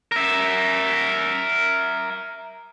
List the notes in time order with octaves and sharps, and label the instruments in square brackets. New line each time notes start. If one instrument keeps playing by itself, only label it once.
[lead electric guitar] A#4 E5